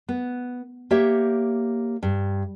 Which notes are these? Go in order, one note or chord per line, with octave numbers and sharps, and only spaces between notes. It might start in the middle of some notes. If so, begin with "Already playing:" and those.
B3
A#3 G4 C#5 E5
G2